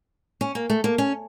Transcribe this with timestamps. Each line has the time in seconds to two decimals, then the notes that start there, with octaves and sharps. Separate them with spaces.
0.41 C#4
0.55 A#3
0.70 A3
0.84 A#3
0.98 C#4